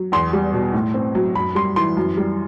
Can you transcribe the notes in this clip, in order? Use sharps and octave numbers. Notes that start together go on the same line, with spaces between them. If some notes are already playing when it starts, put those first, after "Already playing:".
Already playing: F#3
E2 C6
G3
B2
A2
C4
F#3
F#2 B5
G3 C6
E3 C6
F#2
G3